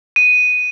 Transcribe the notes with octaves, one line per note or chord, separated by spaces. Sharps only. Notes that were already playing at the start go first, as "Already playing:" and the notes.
D#7